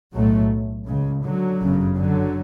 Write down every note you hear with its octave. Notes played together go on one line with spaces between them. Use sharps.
B1 A2 F#3 A3
C#2 C#3
D3 F#3
G1 F#2 C#3
D3 F#3